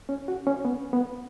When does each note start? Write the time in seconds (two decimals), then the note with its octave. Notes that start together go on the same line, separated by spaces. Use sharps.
0.09 C#4
0.28 F#4
0.47 C#4
0.65 B3
0.93 B3